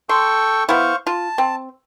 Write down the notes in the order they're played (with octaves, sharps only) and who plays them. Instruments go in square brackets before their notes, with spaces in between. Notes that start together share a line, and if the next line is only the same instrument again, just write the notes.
[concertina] A4 G5 C#6 [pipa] C6
[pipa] B3 E4 [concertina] C5 F5 C#6
[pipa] F4 [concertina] A5
[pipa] C4